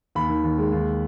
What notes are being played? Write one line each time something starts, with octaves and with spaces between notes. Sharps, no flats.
D#2 B5
D#3
D#2
G#3
D#2